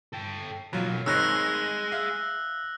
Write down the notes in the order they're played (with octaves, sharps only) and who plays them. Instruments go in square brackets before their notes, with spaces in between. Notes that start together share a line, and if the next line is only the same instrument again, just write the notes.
[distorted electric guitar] A4 G5
[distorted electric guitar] B1 A#2 [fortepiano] F#3 F4
[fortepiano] G#1 D#3 C#5 [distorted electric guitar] G#3 [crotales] E6 F#6 A#6
[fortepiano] E5 F5